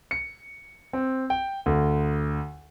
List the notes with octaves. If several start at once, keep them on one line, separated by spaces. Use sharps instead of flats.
C#7
C4
G5
D2